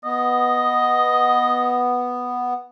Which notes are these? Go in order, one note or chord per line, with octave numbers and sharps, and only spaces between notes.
B3 D#5